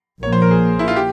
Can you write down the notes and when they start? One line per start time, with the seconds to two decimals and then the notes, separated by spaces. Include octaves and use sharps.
0.23 A#1 A#2 F3 A#3 C#5
0.33 C5
0.42 A#4
0.51 G#4
0.79 E4
0.88 F4
0.96 G4